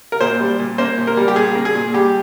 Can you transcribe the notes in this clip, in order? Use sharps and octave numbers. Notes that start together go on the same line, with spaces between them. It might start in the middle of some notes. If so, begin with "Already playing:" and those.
A#4
A#2 C5
G3
A#2
A#3 C5
A#2
A#4
G3
G4
A#2 G#4
A#3
G#4
A#2
G3 G4